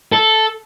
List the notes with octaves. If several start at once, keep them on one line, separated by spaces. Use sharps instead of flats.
A4